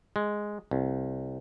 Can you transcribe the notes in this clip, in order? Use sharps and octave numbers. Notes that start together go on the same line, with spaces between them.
G#3
C2